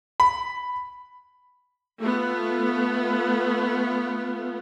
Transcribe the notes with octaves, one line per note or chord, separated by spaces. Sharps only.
B5
A3 B3 F4